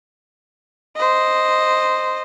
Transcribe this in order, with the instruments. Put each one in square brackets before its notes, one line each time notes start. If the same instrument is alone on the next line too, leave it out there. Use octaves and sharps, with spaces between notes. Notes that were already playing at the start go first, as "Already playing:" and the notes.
[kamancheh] C5 D#5